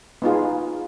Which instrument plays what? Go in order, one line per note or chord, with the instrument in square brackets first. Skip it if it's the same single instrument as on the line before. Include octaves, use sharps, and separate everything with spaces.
[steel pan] B3 D#4 F4 G#4